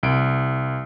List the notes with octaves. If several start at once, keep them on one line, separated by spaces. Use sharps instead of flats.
C2 D7